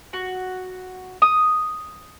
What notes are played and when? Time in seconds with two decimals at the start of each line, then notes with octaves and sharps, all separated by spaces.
0.13 F#4
1.22 D#6